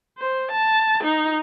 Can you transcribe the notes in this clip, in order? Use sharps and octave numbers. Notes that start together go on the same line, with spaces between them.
C5
A5
D#4